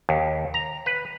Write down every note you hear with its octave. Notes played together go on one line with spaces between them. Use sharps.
D#2
A#5
B4